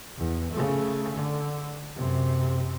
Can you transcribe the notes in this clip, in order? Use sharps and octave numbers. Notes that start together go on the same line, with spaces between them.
E2
C#3 A3
D3
F#2 C3